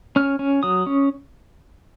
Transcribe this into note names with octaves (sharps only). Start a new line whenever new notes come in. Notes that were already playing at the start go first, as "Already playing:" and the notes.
C#4 F6
C#4
F#3 D#6
C#4